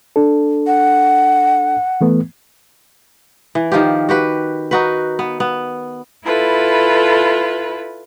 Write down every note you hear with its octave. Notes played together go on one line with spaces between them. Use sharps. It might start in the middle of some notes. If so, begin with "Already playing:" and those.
D4 A4
F#5
E3 A3 B3
E3
D#3 F3 F4 G4
F#4 G4 B4
D#4 F#4 B4
B3
B3
E4 F4 A4 B4